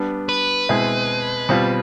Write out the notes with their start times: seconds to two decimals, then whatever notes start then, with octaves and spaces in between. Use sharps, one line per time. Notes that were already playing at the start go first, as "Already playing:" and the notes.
Already playing: G3 B3 D4
0.29 B4
0.69 B2 G#3 C4 E4 G#4
1.49 B2 G3 C4 F4